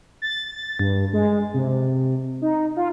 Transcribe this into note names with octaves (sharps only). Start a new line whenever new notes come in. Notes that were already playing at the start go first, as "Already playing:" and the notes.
A6
G2
G#3
C3
D#4
F4